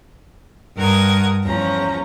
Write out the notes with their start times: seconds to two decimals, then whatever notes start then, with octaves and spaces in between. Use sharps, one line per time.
0.77 G2 A#4 F#5 D#6 G#6
1.44 E2 F3 C#4 A#5